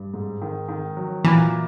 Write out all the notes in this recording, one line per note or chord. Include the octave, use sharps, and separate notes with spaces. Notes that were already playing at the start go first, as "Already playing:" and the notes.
Already playing: G2
G#2
D#3
D#3
F#3
A#2 E3